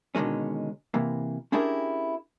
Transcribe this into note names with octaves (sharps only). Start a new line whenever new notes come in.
B2 D3 D#3 G#3 C#4
C3 E3 A#3
C#4 D4 E4 G4 G#4 A#4